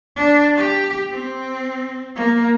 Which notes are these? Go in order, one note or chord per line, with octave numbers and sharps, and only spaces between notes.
D4
G4
C4
A#3